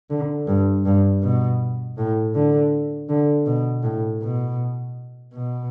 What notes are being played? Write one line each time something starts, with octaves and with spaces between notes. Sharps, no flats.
D3
G2
G2
B2
A2
D3
D3
B2
A2
B2
B2